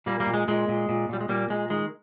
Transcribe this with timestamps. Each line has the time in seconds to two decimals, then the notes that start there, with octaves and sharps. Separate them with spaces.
0.06 A#2 G3 A#3
0.20 G3 A#3
0.27 A#2
0.34 G#3
0.48 A#2 G#3
0.68 A#2
0.89 A#2
1.09 A#2 G3
1.21 G#3
1.29 A#2 G3 A#3
1.50 A#2 G#3
1.70 D#3 G#3